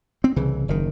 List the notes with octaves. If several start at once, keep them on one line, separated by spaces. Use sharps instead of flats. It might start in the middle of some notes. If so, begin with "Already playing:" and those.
C4
C2 C#3 E3
F#1 D#3